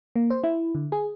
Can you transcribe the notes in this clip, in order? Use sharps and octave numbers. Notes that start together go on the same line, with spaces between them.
A#3
C5
E4
D3
G#4